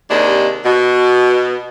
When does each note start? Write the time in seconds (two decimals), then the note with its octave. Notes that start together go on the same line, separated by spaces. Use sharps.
0.11 D#2 C3 G#3 D4
0.64 B2